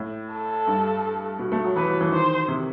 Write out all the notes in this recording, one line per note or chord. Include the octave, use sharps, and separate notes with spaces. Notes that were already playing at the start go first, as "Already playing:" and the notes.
Already playing: A2
A4
G2
B2
A3
F#3
E3 B4
F#3
E3
D#3 C5
C3